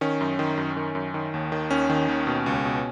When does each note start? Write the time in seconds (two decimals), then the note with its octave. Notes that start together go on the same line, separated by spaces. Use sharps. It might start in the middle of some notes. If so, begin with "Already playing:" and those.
0.01 D#3 C#4
0.21 F#2
0.39 D#3
0.57 F#2
0.77 D#3
0.95 F#2
1.14 D#3
1.34 D#2
1.52 D#3
1.71 D#2 C#4
1.90 D#3
2.08 D#2
2.27 B2
2.46 C#2
2.65 B2